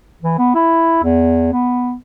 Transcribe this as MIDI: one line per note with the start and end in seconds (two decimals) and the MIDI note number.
0.23 0.37 52
0.39 0.55 59
0.55 0.99 64
1.03 1.49 40
1.52 1.95 59